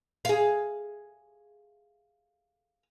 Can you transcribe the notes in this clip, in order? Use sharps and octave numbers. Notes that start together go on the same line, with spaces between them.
G#4 F5